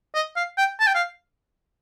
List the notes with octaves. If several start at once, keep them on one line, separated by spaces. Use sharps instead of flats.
D#5
F5
G5
A5
G5
F5